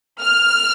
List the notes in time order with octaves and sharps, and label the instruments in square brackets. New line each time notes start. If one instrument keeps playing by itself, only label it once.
[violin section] F6